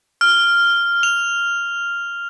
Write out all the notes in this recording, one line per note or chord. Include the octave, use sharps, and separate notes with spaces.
F6
F7